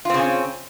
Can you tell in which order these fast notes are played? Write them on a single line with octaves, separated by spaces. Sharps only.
F4 C4 C#3 C#4